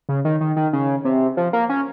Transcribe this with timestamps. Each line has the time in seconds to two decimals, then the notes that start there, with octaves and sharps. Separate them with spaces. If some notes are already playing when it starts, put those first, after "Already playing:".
0.09 C#3
0.25 D#3
0.41 D#3
0.56 D#3
0.73 C#3
1.05 C3
1.37 F3
1.53 A#3
1.69 C#4